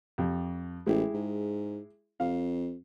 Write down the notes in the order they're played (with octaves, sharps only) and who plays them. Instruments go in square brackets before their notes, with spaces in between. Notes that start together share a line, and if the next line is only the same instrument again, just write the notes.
[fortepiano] F2 G4
[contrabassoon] A1 [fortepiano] G#3 E4 G4
[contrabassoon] G#2
[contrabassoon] F2 [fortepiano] F5